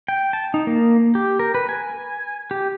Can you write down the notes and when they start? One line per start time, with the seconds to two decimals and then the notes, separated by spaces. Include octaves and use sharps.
0.08 G5
0.33 A5
0.54 D#4
0.67 A#3
1.15 G4
1.39 A#4
1.54 B4
1.69 G#5
2.51 G4